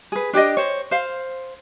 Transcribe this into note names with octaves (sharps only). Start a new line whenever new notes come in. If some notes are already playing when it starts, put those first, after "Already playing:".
G#4 B4
D4 G4 D5 D#5
C5 C#5
C5 F5